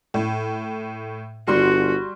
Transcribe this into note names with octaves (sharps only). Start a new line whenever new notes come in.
A2
G1 G3 F#4 C6